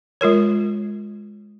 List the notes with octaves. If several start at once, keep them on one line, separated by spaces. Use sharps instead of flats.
G#3 F4 A#4 C#5